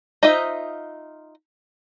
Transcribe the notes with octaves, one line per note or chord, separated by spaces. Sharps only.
D#4 F4 C5 D#5 E5